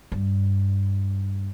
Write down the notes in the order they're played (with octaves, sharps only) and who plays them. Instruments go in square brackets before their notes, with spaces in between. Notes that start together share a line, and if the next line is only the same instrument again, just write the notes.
[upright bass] G2